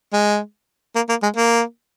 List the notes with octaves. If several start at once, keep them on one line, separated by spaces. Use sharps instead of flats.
G#3
A#3
A#3
G#3
A#3